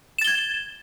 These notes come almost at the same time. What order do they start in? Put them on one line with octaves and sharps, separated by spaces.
E7 A6 G7 G#6